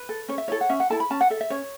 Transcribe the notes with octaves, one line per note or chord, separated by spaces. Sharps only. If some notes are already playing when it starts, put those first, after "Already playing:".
Already playing: B4
A4
C#4 C#5
E5
E4 A4 C#5
F#5
C#4 E5
F#5
E4 A4 A5
B5
C#4 A5
F#5
A4 E5
E5
C#4 C#5